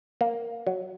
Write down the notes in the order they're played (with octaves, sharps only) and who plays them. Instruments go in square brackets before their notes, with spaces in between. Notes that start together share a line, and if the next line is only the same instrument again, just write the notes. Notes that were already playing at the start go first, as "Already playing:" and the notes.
[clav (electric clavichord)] A#3
F#3